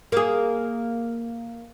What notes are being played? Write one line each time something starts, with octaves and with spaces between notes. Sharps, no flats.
A#3 G#4